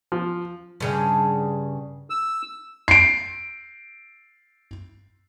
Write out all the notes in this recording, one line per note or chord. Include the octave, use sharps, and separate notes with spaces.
F3
G2 C#3
E6
C7 D7